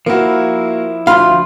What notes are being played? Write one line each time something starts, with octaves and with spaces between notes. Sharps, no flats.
F3 A#3 E4 F#4
D2 F4 F5 B5